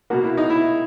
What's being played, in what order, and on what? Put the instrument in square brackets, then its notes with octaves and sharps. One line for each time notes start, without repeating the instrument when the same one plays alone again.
[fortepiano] B2 A#3 F#4
E4
D#4
E4